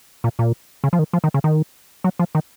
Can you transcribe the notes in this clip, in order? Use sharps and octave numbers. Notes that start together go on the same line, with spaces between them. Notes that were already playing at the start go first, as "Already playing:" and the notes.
A#2
A#2
C#3
F3
D#3
F3
D#3
C#3
D#3
F#3
F3
D#3